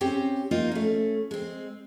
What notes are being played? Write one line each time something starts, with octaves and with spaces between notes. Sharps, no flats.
C4 C#4 G4 G5
A#3 D#4 F4
A3 C#4
G#3 C4